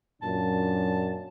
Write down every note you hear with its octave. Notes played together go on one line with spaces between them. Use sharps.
F#2 A#2 D4 A5